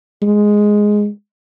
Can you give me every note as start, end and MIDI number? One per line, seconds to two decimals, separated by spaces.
0.22 1.08 56